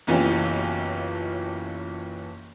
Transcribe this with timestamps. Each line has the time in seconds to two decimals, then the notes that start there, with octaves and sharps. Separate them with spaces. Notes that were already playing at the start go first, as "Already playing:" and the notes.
0.07 F#1 B1 E3 C#4 F4 G4